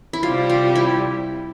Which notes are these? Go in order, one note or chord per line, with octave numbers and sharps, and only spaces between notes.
E4
C3 G3 C4 F4 G4
F4
E4